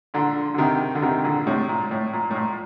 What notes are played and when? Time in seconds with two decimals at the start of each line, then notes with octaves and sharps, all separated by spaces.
0.14 A#2 D3
0.54 D3
0.58 C3 D#3
0.95 D3
1.02 C3 D#3
1.24 A#2 D3
1.47 A2 C3
1.69 A#2
1.91 A2
2.13 A#2
2.31 A2
2.36 A#2